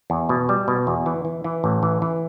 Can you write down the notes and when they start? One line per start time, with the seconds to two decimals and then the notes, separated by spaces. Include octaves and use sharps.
0.10 E2
0.29 B2
0.49 G3
0.68 B2
0.87 E2
1.06 E3
1.25 E3
1.44 E3
1.64 A1
1.83 E3
2.02 E3